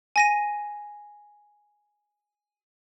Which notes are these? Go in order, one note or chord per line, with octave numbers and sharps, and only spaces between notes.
G#5 A#6 D#7